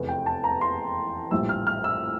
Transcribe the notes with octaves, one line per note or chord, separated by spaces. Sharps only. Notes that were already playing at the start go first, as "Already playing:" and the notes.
Already playing: F1 E2 E3
G5
A5
A#5
C6
A#1 A2 G3 E6
F6
F6
E6